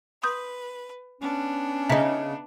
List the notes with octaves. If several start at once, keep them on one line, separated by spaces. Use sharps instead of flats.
B4 C6 D#6 G6
B3 C#4 D4
C#3 D#4 E5 A#5 B6